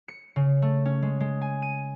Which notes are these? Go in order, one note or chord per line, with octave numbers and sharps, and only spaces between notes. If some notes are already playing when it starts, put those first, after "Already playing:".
C#7
C#3
A3
C#4
G#3
G#3
G#5
D#7